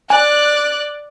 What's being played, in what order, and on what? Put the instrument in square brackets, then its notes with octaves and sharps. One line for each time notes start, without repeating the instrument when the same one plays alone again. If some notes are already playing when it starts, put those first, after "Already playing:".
[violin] D5 [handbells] G#5 [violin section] F#6